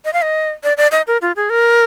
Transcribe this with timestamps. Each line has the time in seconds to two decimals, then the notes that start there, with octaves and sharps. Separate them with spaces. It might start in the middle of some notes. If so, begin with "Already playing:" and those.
0.05 D#5
0.13 F5
0.22 D#5
0.63 D5
0.77 D5
0.92 D#5
1.07 A#4
1.22 F4
1.36 G#4
1.50 A#4